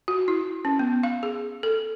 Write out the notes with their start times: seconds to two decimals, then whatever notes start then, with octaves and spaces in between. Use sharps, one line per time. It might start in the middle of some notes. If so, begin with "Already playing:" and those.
0.08 F#4
0.28 E4
0.65 C#4
0.79 B3
1.03 F5
1.23 G#4
1.63 A4